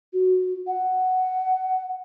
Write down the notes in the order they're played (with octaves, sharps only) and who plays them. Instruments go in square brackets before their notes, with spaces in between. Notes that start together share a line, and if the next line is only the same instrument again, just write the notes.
[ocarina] F#4
F#5